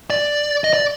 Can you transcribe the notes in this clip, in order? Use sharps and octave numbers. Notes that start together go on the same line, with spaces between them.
D5
D#5
D5